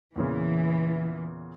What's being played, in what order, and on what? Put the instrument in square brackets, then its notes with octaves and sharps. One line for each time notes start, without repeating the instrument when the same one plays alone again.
[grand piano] E2 A#2 C#3 [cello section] E3